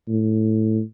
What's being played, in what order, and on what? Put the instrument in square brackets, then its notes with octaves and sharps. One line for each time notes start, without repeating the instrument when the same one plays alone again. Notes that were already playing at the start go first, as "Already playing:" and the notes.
[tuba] A2